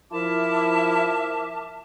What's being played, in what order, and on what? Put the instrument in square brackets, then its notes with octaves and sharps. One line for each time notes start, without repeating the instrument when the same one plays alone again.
[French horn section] F3 E4 [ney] A#4 [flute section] E5 A5 D6